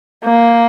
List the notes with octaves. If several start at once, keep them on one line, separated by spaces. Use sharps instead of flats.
A#3